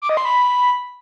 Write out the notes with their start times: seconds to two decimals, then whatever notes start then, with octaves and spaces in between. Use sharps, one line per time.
0.02 D6
0.09 D#5
0.17 C6
0.25 B5